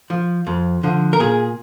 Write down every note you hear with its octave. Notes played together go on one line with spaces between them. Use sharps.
F3
F2
D3 F3
A#4
A#2 G#4